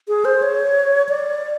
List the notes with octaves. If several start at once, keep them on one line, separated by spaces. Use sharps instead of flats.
G#4
C5
C#5
D5